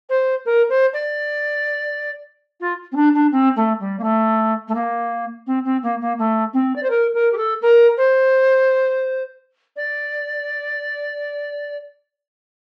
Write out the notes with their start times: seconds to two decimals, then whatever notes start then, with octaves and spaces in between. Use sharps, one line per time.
0.09 C5
0.46 A#4
0.69 C5
0.93 D5
2.60 F4
2.92 C4
2.96 D4
3.14 D4
3.32 C4
3.56 A3
3.80 G3
3.99 A#3
4.03 A3
4.68 A3
4.75 A#3
5.47 C4
5.65 C4
5.83 A#3
6.01 A#3
6.18 A3
6.54 C4
6.76 D5
6.83 C5
6.90 A#4
7.14 A#4
7.32 G4
7.37 A4
7.62 A#4
7.97 C5
9.76 D5